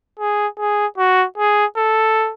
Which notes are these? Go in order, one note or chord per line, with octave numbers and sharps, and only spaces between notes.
G#4
G#4
F#4
G#4
A4